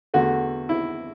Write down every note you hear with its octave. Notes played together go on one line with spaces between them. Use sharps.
E2 D3 A3 F#4
E4